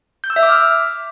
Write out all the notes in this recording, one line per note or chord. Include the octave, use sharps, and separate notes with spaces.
G6
E6
E5
D6
F6